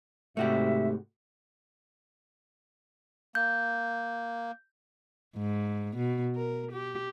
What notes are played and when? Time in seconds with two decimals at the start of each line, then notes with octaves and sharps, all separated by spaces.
0.37 G#2 C3 A3 F#4 G4 E5
3.35 A#3 G6
5.37 G#2
5.97 B2
6.36 A#4
6.73 G4